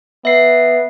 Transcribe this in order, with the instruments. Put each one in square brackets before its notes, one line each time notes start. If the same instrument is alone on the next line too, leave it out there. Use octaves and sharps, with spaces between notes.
[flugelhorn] B3 [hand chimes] E5 C7